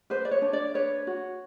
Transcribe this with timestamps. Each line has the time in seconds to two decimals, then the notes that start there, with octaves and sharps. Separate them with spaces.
0.10 B4 C5
0.25 D5
0.31 C#5
0.42 D4
0.53 D5
0.74 B4 C#5
1.07 F#4